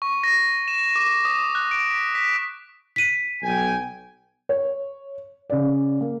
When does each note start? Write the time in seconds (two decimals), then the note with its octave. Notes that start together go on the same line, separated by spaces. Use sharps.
0.02 C#6
0.23 A#6
0.68 E7
0.96 D6
1.25 D#6
1.55 F#6
1.71 D7
1.90 B6
2.15 B6
2.96 B6 D#7
3.43 B1 G5 G#5
4.49 C#5
5.50 C#3 D5
6.00 A#3